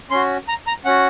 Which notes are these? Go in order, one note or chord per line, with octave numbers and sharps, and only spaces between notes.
C#4 F#4 C6
A#5
A#5
C#4 F#4 F#5